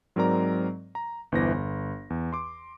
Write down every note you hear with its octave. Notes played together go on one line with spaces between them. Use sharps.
G#2 F#3 C4 A#4 D5 A#5
A#5
G1 E2 E3 B3 C5 A#6
G1
E2
C6 D6